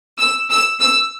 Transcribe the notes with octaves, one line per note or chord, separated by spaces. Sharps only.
E6
E6
E6